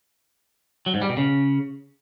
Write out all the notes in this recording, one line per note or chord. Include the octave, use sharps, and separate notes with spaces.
F#3
G#2
G3
B2
C#3